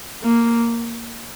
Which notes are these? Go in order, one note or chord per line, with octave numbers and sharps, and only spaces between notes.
A#3